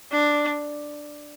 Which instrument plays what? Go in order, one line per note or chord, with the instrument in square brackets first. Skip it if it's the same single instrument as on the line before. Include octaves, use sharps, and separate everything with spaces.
[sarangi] D4